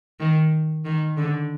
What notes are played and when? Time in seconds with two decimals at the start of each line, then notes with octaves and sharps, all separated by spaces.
0.20 D#3
0.85 D#3
1.17 D3